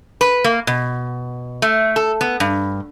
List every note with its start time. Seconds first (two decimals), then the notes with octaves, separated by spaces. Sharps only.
0.21 B4
0.44 A#3
0.67 B2
1.62 A3
1.96 A4
2.21 B3
2.40 G2